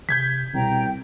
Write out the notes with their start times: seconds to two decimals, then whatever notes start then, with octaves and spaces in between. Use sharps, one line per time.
0.09 C3 G6 G#6 B6
0.54 C2 B2 G5 A#5